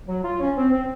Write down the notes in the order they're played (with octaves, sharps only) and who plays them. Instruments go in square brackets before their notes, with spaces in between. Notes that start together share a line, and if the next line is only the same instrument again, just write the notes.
[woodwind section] F#3
F4
C#4
C4
C4